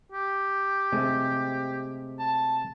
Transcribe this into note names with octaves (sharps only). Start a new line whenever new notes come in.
G4
C3 G#3 A3
A5